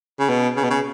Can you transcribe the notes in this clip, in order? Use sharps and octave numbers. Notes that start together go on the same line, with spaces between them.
C#3
B2
C#3
B2
C#3